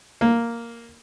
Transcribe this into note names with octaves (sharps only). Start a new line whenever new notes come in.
A#3